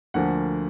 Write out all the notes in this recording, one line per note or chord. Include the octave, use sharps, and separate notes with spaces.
D2 D3 F3 A#3 F#5